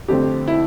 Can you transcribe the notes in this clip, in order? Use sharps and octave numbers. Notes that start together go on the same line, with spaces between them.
F2 D3 A3 C4 G4
E4